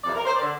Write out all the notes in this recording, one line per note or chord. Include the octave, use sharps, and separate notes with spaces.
F2 C3 E3 D5
A#4
C5
D5
D3